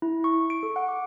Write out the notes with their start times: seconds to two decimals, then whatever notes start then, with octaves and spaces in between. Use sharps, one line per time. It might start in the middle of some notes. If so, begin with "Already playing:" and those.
0.02 E4
0.24 C#6
0.50 D7
0.63 A4
0.76 F#5
0.88 D6